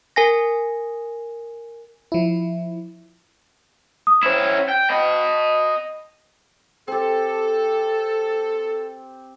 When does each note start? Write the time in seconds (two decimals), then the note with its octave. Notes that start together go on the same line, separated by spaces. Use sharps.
0.16 A#4 G#5 A#6
2.12 F3 E4
4.07 D#6
4.23 C#4 E4 C5 E7
4.69 G5
4.90 D#5 G5 B5
6.88 C4 G4 A4